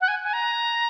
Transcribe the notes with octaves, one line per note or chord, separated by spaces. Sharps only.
F#5
G#5
G#5
A#5